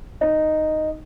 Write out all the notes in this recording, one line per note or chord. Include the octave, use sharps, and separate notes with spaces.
D#4